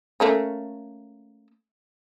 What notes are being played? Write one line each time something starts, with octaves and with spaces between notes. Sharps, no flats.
A3 A#3 C#4